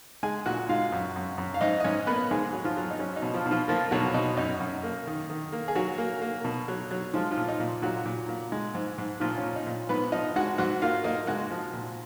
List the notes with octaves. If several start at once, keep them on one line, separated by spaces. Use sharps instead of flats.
G#3 G#4 G#5
A#2 F#4 F#5
G#3 F4 F5
F#2
F#2
F#2
F5
G#2 D#4 D#5
D#5
G#2 C#4 C#5
A#3 B3 B4
G#2 G#3 G#4
F#3
F3 F4
F#3
D#4
F#3 C#4
D#4
B2
F3 F4
B2
F3 F4
F3 A#3 F4
B2 F#3 F#4
B2 D#4
F#2 D#4
F#2
A#3
D#3
D#3
A#3
G#4
F#3 F#4
A#3
A#3
B2
F#3
F#3
F3 G#3 F4
F3 F4
A#2
D#4
A#2
A#2 F#3 F#4
A#2
A#2
G#3
G#2
G#2
A#2 F3 F4
C#4
A#2
D#4
A#2
G#2 B3 B4
F3 D#4 D#5
G#3 F#4 F#5
G#2 F#4 F#5
A#3 F4 F5
A#3 D#4 D#5
G#3 F#4 F#5
F3
A#2